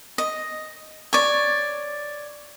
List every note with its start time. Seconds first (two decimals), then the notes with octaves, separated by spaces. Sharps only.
0.18 D#5
1.13 C#5 D5